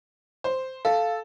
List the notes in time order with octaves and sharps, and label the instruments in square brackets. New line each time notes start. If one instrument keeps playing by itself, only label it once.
[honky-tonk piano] C5
[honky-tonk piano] A4 [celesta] F5